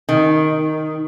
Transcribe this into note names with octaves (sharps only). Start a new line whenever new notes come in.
D#3